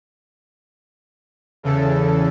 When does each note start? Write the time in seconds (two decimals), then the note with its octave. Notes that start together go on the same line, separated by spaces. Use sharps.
1.63 E2 C#3 A4